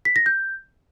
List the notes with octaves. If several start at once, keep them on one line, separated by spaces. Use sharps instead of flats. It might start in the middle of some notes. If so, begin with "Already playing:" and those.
B6
A#6
G6